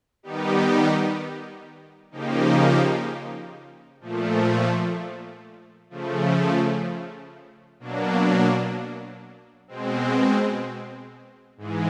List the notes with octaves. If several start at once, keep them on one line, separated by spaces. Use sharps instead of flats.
D#3 G3 B3 D#4 G4
C#3 F3 A#3 D#4 G4
A#2 F3 A3
C#3 F3 A3
B2 F#3 A#3 D4
B2 G#3 C4
G#2 E3 G#3